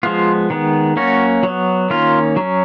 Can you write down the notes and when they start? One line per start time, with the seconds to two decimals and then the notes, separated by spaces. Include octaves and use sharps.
0.03 F3 G#3 B3 F4
0.50 D#3 G#3 B3
0.96 F#3 A#3 C#4 F#4
1.43 F#3 B3
1.90 D#3 A#3 C#4 F4
2.36 F#3 C#4